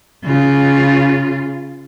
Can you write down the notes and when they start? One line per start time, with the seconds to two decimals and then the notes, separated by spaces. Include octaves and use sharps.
0.24 C#3 F4